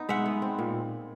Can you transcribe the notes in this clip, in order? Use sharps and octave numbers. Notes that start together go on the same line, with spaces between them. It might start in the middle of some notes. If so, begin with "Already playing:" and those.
Already playing: B3 D#4
G#3 E5 F#5
B3
C4
A#2